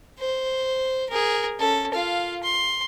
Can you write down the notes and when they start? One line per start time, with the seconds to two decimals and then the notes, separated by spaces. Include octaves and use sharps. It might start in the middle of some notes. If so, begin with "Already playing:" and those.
0.20 C5
1.10 G#4 A#4
1.59 C#4 A4
1.93 F4 F5
2.43 C6